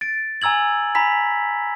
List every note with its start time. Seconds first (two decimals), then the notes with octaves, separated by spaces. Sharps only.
0.01 A6 D7
0.42 G#5 A#5 E6 G#6 F#7
0.95 G#5 A#5 B5 B6